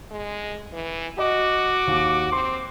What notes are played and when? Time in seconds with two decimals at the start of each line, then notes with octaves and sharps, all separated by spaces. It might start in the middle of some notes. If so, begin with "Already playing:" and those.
0.11 G#3
0.73 E3
1.18 F#4 D#5 D6
1.87 D#2
2.32 C4 C6